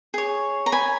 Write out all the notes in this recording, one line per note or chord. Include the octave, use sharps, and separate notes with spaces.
G#4 C#5
A#5
G#5 B5